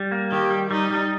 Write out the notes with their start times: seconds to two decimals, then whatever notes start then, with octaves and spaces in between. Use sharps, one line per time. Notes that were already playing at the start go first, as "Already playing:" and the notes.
Already playing: G3
0.11 A#3
0.31 D#3 G4
0.51 G3
0.71 G3 D#4
0.91 G3